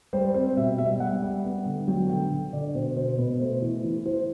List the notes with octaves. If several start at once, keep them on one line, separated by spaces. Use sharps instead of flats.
G3 C5
C4 C5
B2 E5
G3 E5
G3 F#5
G3
B3
D3
F#3 G5
D3 G5
D3
D3 D5
B2 C5
B2 C5
B2 B4
A3 C5
E3
E3
E3 C5